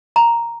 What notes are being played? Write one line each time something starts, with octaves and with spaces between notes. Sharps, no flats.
A#5